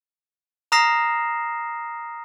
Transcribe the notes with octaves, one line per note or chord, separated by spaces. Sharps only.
A#5 D#6 F6 A#6 C7 E7